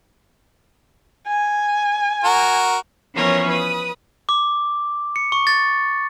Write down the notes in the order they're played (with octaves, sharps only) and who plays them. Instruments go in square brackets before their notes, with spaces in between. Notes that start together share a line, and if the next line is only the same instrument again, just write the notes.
[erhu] G#5
[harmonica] F#4 A#4
[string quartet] E3 F3 B3 C#4 A#4 C#5
B4 D#6
[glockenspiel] D6
C#7
C#6
A6